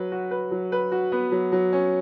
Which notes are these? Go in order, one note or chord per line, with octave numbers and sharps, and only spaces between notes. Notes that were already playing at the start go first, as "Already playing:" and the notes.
Already playing: F#3 B4
F#4
B4
F#3
B4
F#4
B3
F#3
F#3
C#4